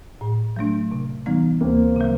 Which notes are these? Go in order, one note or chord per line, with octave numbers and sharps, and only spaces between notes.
A2
F#3 A3 D4
C3
E3 G3 B3 D#4
D2 A#3 C4
C#3 F#3